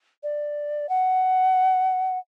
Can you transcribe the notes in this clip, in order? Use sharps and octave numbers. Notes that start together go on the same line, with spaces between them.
D5
F#5